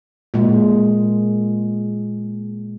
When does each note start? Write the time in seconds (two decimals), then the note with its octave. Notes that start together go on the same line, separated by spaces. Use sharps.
0.34 A#2 G#3